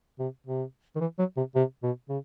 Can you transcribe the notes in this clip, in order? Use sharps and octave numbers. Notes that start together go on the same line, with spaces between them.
C3
C3
D#3
E3
F#3
C3
C3
B2
C#3